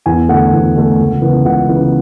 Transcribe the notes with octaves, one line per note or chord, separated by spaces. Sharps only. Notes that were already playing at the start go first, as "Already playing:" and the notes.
E2 G#5
D3 A3 F#5
E2
D3 A3
C#2
C#3 E3 B3
C#2 F#5
C#3 E3 B3